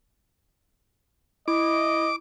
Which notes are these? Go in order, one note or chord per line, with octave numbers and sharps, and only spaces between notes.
E4 D#5 D6